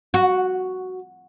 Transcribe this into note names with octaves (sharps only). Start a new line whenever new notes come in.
F#4